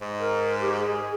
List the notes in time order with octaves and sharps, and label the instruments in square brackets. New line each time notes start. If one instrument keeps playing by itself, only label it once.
[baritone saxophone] G#2
[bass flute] A#4
G4
G#4